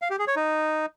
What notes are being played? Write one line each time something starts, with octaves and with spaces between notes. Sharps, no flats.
F5
G4
G#4
C#5
D#4